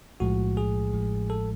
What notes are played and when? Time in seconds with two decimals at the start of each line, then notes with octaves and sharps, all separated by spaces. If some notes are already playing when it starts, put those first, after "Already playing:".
0.20 B1 A2 F3 G#3 F#4
0.57 G#4
0.93 A1 A2 F3 G#3
1.30 A4